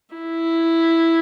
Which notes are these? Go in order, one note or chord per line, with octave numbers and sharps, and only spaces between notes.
E4